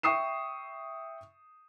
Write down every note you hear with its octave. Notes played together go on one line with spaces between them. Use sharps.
E5 G5 C#6 D#6 C7 E7